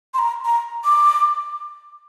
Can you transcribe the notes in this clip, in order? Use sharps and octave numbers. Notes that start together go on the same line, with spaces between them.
C6
A#5
A#5
D6